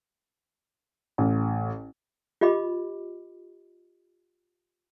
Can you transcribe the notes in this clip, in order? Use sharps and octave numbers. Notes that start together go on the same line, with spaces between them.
A1
F4 G4 D#5 B5 D6